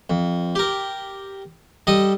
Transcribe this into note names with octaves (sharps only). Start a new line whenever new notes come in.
F2
G4 A#4
G3 A4 D#5